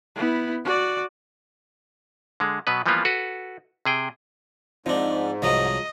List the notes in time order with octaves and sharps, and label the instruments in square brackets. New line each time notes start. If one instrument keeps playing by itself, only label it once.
[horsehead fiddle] B3 E4
F#4 D5
[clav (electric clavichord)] D3 G#3
B2 F#3 B3 B4
E3 F3 G3 A#3 B3 F4
F#4 A4 B4
C3 G#4 G5
[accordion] G#2 [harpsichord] F3 D4 [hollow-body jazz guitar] C4 D#4 F4
[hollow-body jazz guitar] C2 [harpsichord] F3 F#3 G#3 [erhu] D#5